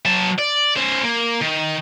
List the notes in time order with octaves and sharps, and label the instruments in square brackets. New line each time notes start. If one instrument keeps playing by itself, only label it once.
[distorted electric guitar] F#3 A5
D5
C#4 C5
A#3
D#3